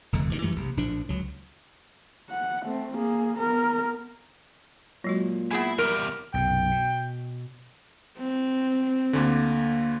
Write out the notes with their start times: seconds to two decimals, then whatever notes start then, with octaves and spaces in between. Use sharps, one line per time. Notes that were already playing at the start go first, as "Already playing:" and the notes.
0.13 F1 E2 D3 G#3
0.29 D2 G2 A#2 D#3
0.42 F#2 E3 G3 A3
0.56 A#1 C3
0.77 A#1 A2 F3 D4
1.09 C#2 F#3
2.30 F#5
2.65 A3 C4
2.95 A#3 G#4
3.37 B3 A#4
5.04 A#2 F#3 G#3 F#4
5.51 B3 E4 G#4 G#5
5.79 E2 G3 A#4
6.34 B1 F#2 C3 G5
6.71 B2
8.18 C4
9.13 D2 D3 A#3